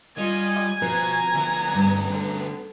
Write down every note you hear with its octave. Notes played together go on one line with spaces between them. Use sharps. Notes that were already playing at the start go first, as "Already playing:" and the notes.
G3 F4 D#5 G#5
B2 F3 B3 B4 C5 A#5
D2 B3
G2
D3